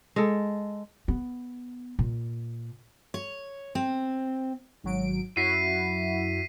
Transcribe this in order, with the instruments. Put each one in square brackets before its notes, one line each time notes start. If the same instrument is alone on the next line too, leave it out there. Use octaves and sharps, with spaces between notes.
[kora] G#3 A4
[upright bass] B3
A#2
[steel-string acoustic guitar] C#5
C4
[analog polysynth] G#1 F#3 D7
[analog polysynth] F#2 E4 F#4 [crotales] B6 C7 D#7